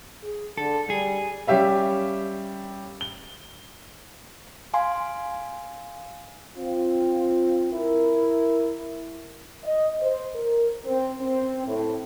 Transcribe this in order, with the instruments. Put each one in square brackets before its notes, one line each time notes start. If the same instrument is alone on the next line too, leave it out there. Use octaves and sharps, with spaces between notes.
[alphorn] G#4
[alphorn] D3 [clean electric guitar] A4
[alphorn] G3 [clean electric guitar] G#4
[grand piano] G3 C#4 G4 E5 F5
G7
[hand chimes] F5 G#5 C6
[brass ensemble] C4 F4
E4 A#4
D#5
C5
A#4
C4
C4
A2